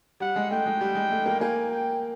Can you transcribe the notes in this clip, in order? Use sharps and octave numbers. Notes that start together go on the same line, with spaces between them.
G3 F#5
G#3
A3 G5
G#3
G3
G#3
A3
A#3
A#3 G#5
G5